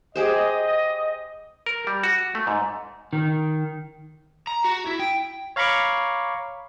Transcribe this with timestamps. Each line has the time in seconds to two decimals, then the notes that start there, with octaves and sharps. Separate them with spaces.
0.16 G4 G#4 C5 D#5
1.66 A#4
1.87 G3
2.04 F#4
2.35 A3
2.47 G#2
3.13 D#3
4.47 A#5
4.65 F#4
4.87 E4
4.99 G5
5.56 C#5 F5 A#5 B5 C#6 D6